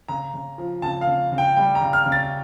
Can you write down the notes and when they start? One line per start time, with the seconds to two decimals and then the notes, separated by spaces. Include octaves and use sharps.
0.08 C#3 A#5
0.34 C#3
0.58 F3
0.82 C#3 A5
1.01 F5
1.07 C#3
1.32 C#3
1.38 G5
1.57 G3 G5
1.75 A#5
1.81 C#3
1.93 F6
2.06 C#3
2.12 A6